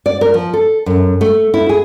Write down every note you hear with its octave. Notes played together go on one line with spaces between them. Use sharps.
D5
A#4
F3
A4
F#2
A3
E4
G#4